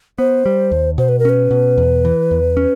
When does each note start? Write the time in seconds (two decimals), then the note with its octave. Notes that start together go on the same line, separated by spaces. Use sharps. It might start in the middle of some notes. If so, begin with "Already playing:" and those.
0.18 B3 C5
0.46 G3
0.72 D#2
0.98 B2 C5
1.09 B4
1.19 A#4
1.25 C#4 B4
1.51 B2
1.78 E2
2.05 E3
2.31 E2
2.57 C#4